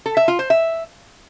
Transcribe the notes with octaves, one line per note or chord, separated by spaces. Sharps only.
A4
E5
F4
C5
E5